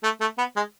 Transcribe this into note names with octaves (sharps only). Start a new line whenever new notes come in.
A3
A3
B3
G#3